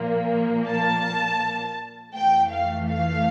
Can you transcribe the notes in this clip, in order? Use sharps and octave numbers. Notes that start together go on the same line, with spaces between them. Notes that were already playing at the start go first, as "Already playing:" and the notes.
Already playing: A#2 F3 A#3
A5
F2 E3 A3 G5
F5
F5